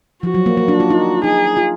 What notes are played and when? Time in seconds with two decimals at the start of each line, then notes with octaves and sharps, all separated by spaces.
0.23 F3 F#4
0.34 F#3
0.46 A#3
0.57 A#3
0.68 D4
0.80 F4
0.90 D#4
1.24 D#4 G#4
1.57 F4